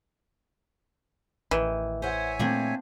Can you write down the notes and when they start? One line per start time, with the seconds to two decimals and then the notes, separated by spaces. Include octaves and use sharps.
1.51 A1 D#3 E3
2.02 C5 C#5 E5 F#5 G#5
2.39 A#2 A3 A#3 C4 D4